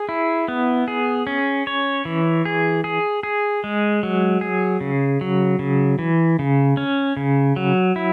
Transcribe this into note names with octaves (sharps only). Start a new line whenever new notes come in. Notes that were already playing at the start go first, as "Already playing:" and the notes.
Already playing: G#4
E4
B3
G#4
C#4
C#5
E3
G#4
G#4
G#4
G#3
F#3
G#4
C#3
F#3
C#3
E3
C#3
C#4
C#3
F#3
E4